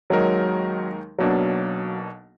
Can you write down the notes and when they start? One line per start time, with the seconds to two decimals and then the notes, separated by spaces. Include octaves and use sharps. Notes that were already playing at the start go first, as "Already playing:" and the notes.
0.10 D#2 D#3 F#3 G#3 D#4 A#4
1.18 B1 B2 F#3 A#3 D4